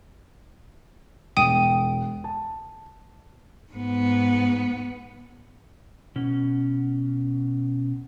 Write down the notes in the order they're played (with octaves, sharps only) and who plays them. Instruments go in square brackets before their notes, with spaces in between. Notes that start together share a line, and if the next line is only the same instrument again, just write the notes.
[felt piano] E1 [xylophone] G5 D#6 D#7
[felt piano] A5
[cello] G#2 B3
[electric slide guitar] B2 C#4